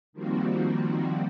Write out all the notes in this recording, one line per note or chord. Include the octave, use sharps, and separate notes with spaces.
D#3 F3 G3 A#3 C4 F#4